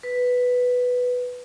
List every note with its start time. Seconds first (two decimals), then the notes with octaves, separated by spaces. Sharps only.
0.03 B4